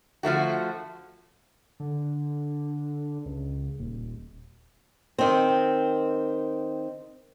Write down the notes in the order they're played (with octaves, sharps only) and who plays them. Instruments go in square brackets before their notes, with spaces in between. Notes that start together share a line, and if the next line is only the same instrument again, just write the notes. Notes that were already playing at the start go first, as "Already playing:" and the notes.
[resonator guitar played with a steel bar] D3 F3 A3 F#4
[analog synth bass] D3
C#2
D#1
[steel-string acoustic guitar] D#3 C4